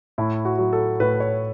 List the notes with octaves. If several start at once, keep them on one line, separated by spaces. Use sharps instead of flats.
A2 E4
F#4
F#3
A4
A2 B4
C#5